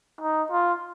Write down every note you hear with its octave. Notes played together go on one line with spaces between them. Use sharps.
D#4
F4